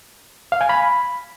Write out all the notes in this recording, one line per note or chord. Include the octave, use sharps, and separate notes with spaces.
F5
G#5
B5